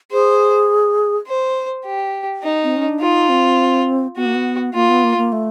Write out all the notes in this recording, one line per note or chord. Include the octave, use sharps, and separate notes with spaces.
G#4 C5
C5
G4
D#4
C4
C#4
D4
D#4 F4
C4
B3 F#4
A#3
B3
A#3 F4
B3
A#3
A#3
A3